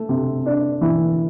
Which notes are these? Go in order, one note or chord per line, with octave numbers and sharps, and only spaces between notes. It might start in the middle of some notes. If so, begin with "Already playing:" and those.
Already playing: A3
C3
D4
E3